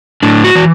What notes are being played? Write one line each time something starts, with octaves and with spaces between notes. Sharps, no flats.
A2 D4
F#4
E3